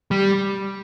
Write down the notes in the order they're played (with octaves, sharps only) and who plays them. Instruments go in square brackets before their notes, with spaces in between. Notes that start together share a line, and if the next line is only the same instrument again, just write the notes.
[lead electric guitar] G3